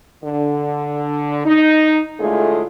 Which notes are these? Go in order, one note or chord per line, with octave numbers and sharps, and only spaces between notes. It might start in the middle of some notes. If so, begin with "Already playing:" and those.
D3
D#4
A2 D3 G#3 A3 F4 G#4